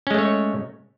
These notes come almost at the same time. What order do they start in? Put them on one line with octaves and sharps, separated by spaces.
C#4 G#3 A3 C#5